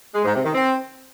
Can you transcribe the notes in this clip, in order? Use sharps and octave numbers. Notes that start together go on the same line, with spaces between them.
G#3
G#2
C3
D#3
C4